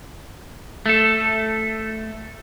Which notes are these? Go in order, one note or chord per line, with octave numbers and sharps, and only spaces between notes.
A3 A4